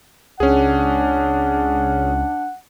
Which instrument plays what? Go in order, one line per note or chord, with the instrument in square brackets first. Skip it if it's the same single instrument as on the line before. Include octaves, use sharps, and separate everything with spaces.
[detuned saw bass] C#2 [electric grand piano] C#4 G#4 [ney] D4 [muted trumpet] F#5